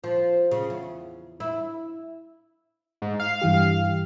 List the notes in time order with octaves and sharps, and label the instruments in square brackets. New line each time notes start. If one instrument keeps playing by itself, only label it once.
[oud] F3
C#3
E2
E4
[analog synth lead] G#2
F5
[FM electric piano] G2 E3 G4